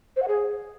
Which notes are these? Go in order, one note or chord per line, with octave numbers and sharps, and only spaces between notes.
C5
F#5
G#4